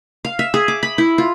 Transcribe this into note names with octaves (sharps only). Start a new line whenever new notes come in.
F5
E5
G#4
D6
B5
E4
F4